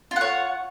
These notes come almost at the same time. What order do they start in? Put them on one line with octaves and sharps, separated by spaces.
F4 F#5 C#5